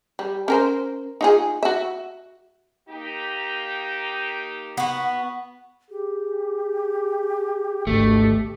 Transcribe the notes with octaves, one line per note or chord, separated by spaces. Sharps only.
G3
C#4 A#4 C5
D#4 F4 G#4
F#4 E5
A#3 D#4 G4
B3 F#4
G4 G#4
G#1 D2 B2 A3